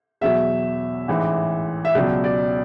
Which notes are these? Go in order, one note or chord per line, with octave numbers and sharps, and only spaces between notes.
E2 B2 F#3 E5
A1 G#2 E3
E5
C#2 B2 F#3 D5
D5